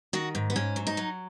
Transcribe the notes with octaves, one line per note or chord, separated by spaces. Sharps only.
D#3 F#4
G#2
B3
G#2 C#4
F#3
D#4
F#3